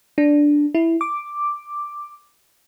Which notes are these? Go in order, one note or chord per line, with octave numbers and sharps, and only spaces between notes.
D4
E4
D6